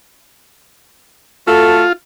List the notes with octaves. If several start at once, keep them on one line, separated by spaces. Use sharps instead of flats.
A3 F4 F#4 A4